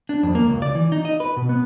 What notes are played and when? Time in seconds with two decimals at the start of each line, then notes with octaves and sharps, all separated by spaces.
0.09 D4
0.23 F2
0.35 A#3
0.48 C#2
0.62 D5
0.75 E3
0.92 D#4
1.05 D#5
1.20 B4
1.37 B2
1.49 B3